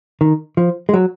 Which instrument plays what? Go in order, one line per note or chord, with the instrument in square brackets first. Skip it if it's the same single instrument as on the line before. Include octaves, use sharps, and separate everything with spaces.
[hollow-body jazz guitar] D#3
F3
G#3
F#3